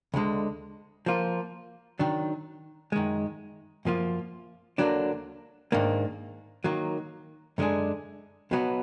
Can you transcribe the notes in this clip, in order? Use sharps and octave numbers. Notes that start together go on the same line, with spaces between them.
D2 D3 G#3
F3 A#3 F4
D#3 F#3 D4
F#2 D#3 G#3
F#2 F3 A#3 F4
D2 D3 F#3 A#3 D4
G#2 D#3 A#3 D4
D#3 F#3 A#3
F#2 D3 G#3 D4 G#4
B1 B2 F#3 B3